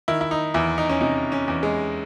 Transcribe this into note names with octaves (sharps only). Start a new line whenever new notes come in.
D#3 E4
E4
D#4
E2 E4
D#4
C#4
C3 D#4
C#4
E2
G#3